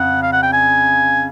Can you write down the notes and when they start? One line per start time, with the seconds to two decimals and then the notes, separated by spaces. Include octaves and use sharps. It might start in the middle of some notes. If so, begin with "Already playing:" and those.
Already playing: F2 C#3 F#5
0.23 F5
0.33 F#5
0.43 G5
0.53 G#5